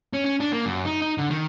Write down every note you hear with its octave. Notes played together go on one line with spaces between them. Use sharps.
C#4
C#4
D4
A#3
F#2
D#4
D#4
D3
D#3